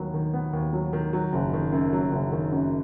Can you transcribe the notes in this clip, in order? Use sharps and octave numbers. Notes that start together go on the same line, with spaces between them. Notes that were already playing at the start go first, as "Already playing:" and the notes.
Already playing: D#2 F#3 B3
D#3
B3
D#2
F#3
D#3
F#3
F#1
D#3
F#2
F#3
F#1
D#3
F#2